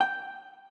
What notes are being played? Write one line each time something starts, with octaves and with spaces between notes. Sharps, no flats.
G5